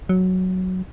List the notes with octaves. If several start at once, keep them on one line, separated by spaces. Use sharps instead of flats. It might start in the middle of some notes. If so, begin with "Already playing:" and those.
F#3